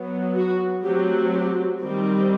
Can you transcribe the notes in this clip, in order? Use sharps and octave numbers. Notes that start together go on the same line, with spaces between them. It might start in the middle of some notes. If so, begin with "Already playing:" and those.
Already playing: F#3 B3
F#4
F#3 A3 C4 G4
G4
D#3 G3 C4